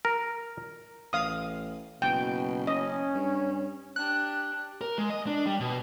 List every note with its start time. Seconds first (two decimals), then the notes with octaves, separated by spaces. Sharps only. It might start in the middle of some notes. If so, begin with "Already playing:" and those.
0.05 A#4
1.13 A1 F5 D#6
2.02 F#1 B2 G5
2.67 C#4 D#5
3.15 G2
3.96 D4 G4 F#6
4.81 A#4
4.98 G#3
5.10 D#5
5.27 D4
5.47 G3
5.60 B2